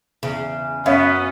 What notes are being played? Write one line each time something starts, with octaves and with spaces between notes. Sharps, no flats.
E2 C#3
F#2 B3 C#4 C#5 E5 F5